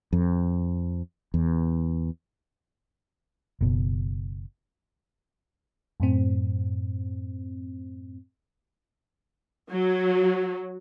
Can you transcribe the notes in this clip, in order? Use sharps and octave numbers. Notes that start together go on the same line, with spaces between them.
F2
E2
F#1 B2
F#2 A2 C4
F#3